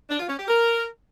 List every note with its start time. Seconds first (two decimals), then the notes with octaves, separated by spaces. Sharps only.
0.08 D4
0.18 F4
0.28 C#4
0.38 G4
0.48 A#4